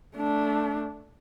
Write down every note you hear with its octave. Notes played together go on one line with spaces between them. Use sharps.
A3 D4